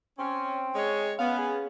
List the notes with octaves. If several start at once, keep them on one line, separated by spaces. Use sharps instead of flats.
C4 C#4
G#3 C#5
B3 C#4 F5
G#4